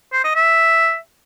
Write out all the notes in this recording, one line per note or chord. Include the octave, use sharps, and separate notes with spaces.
C5
D#5
E5